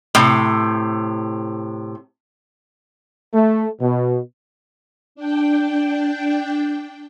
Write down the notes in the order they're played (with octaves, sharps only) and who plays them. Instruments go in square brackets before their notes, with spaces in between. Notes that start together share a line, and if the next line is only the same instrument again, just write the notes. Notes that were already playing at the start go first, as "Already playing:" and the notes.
[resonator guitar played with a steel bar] A2 C3
[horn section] A3
B2
[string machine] D4 G5